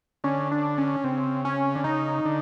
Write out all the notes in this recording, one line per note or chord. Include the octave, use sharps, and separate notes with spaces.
D3 C#4
D4
C#4
C#3 C4
C#4
D3
C#3 D#4
D3